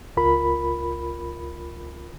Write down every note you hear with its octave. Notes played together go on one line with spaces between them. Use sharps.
C#2 F4 A#4 B5